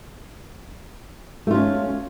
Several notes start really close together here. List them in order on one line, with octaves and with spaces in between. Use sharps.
A3 F4 C#4